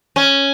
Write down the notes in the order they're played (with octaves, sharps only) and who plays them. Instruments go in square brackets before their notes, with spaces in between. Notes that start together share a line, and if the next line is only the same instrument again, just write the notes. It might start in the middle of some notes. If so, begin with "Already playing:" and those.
[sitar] C#4